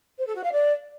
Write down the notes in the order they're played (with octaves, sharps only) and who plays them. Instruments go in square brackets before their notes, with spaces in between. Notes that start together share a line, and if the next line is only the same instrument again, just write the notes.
[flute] C5
A4
F#4
F5
D5